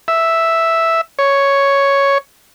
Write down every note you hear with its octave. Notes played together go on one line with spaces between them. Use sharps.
E5
C#5